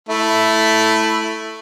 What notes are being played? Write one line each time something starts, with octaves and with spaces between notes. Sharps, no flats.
A3 E4